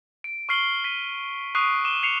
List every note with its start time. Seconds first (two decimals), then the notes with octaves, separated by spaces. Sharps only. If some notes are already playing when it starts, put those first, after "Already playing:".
0.24 D7
0.49 C#6 F6 C7 F#7 G7
0.84 B6 C7 D#7
1.55 C#6 D#6 F#6 C7 D7 D#7
1.84 D6 D#7 E7 G7
2.03 C7 C#7 F7